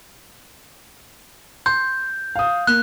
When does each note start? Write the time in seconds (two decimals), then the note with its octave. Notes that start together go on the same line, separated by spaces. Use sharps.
1.66 C6 G6
2.36 F5 D#6
2.67 A#3 F#6